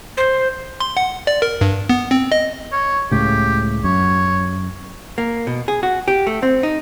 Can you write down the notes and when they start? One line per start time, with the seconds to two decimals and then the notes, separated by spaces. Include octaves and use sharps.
0.17 C5
0.80 C6
0.97 F#5
1.27 D5
1.42 A#4
1.61 G2
1.89 B3
2.11 C4
2.32 D#5
2.72 C#5
3.11 C#2 A2 C#3 G4
3.84 F#2 C#5
5.18 A#3
5.47 B2
5.68 G#4
5.83 F#4
6.08 G4
6.27 A3
6.43 C4
6.63 D#4